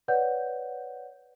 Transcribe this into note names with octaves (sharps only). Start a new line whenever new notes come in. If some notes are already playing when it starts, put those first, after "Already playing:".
B4 C#5 D5 F#5 G6